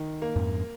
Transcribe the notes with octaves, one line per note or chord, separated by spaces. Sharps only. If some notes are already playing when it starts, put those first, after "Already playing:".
Already playing: D#3
A#3
F2 G#2